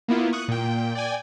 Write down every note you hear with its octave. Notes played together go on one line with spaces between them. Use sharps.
A#3 B3 E4 F4
C#6 D#6 F#6
A#2 G5
D5 G5 G#5